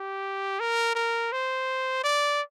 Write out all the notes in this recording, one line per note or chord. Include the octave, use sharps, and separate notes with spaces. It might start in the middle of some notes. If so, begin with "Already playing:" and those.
Already playing: G4
A#4
A#4
C5
D5